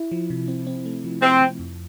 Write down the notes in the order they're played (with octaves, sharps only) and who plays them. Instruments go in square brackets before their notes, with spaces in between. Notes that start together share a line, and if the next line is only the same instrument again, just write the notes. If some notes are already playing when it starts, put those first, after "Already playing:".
Already playing: [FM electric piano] E4
F3
C3
C4
C4
A3
F3
[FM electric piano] F3 [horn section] C4
[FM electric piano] F3
F2